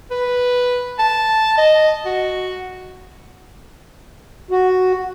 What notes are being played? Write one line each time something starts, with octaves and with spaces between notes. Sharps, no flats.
B4
A5
D#5
F#4
F#4